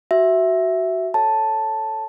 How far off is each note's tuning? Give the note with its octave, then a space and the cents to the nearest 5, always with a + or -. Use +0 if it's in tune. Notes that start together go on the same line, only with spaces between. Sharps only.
F#4 +15 E5 +0
A4 +0 C#5 +0 A5 +0